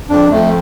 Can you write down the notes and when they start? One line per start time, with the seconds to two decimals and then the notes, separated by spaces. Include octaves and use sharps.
0.09 F2 D4
0.30 F2 A3